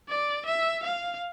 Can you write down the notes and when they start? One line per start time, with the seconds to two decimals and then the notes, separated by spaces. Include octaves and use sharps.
0.09 D5
0.46 E5
0.83 F5